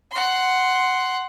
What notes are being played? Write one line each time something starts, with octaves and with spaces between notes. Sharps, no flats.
F#5 C6